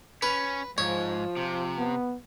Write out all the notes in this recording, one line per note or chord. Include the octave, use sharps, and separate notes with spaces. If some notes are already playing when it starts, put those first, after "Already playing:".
C#4 B4
G#2 F3 C#5
C3
B3